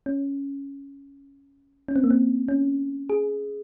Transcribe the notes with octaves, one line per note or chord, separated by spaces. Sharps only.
C#4
C#4
C4
A#3
C4
C#4
G#4